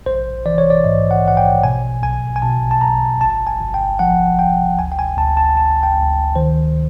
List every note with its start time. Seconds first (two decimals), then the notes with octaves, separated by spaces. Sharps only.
0.06 A#1 C5
0.46 E3 D5
0.58 C#5
0.70 D5
0.84 G#2 D#5
1.11 F#5
1.25 A#1 F#5
1.37 G5
1.63 B2 G#5
2.03 B1 G#5
2.36 G#5
2.42 B2 A5
2.71 A5
2.81 B1 A#5
3.21 G1 A5
3.47 G#5
3.61 G1
3.74 G5
3.99 F3 F#5
4.39 G1 G5
4.78 D2 G#5
4.92 G5
4.99 G#5
5.18 D2 A5
5.37 A5
5.57 D2 A5
5.83 G5
5.97 D2
6.36 D#3 C5